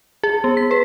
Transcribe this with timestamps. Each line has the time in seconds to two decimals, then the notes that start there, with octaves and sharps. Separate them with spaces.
0.23 G#4
0.44 B3
0.57 B6
0.71 B4